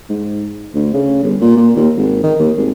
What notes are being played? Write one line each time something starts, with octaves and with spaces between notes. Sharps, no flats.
G#2
D2
C#3
G1
A#2
A#2
D#2
G#1
D#3
D#2
G#1